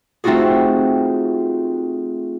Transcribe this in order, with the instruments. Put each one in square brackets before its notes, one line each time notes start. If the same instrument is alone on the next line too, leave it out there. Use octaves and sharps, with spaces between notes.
[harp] A3 C4 D#4 F4 F#4 G#4